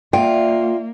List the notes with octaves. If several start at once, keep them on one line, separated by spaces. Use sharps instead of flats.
A#3 F4 D5 E5 G5